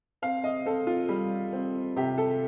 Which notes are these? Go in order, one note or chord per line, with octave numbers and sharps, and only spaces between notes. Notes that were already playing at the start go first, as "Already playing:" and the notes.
C4 F5
D#5
C4 A4
F4
G3
C4
C3 G4
A4